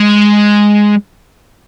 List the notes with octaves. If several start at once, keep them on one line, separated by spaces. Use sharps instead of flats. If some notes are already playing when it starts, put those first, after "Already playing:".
Already playing: G#3